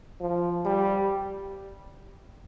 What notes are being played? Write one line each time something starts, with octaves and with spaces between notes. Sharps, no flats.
F3
G3